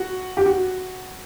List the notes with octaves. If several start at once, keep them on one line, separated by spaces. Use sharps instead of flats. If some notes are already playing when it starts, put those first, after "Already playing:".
Already playing: F#4
G4
F#4